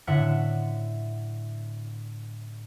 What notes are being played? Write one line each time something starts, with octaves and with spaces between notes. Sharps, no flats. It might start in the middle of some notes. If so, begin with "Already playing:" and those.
A2 D3 E5 F#5 F#6